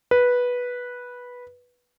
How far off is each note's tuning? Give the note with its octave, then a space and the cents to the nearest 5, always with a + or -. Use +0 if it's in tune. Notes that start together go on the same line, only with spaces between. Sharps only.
B4 -10